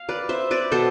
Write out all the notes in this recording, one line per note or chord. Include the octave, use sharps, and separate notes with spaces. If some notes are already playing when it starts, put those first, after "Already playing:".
Already playing: F5
B4 D5
C5 E5
B4 D5
B2 B3 A4 C5